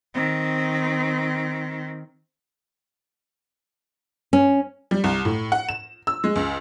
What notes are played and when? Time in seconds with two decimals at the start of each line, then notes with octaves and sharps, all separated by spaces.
0.15 D#3 C4
4.33 C#4
4.91 G3
5.04 C2
5.25 A2
5.52 F#5
5.69 E7
6.07 E6
6.24 G#3
6.36 C#2